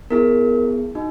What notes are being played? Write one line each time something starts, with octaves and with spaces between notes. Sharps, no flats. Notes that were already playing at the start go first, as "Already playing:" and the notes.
B3 E4 G#4 A#4
D#4 F#4